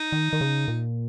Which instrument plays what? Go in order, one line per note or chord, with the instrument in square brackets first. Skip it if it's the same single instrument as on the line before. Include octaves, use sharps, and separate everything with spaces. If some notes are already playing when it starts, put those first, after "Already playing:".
Already playing: [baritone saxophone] D#4
[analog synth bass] D#3
D#3
C#3
A#2